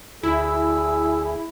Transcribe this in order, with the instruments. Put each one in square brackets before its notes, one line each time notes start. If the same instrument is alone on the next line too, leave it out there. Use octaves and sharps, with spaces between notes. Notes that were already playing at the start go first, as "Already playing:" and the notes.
[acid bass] D2 [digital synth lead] E4 [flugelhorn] G#4 [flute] E6